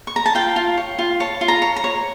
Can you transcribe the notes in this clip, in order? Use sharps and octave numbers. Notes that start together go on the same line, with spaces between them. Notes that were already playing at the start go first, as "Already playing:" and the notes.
C#6
A#5
A5
F4 G5
F4
C#5
F4
C#5 A5
F4
A#5
C#5
A#5
C#5